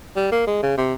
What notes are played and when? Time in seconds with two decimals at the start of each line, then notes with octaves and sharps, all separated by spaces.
0.16 G3
0.32 A#3
0.47 G#3
0.63 C#3
0.78 C3